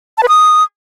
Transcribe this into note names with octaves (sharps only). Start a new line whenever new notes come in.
A5
B4
D#6